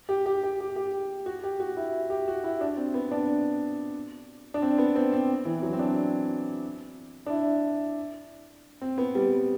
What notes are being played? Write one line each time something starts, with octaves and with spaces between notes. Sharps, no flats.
G4
G4
G4
G4
G4
F#4
G4
F#4
E4
G4
F#4
E4
D4
C4
B3
D4
D4
C4
B3
C4
C4
E3
F#3
C4
D4
D4
E4
C4
B3
G3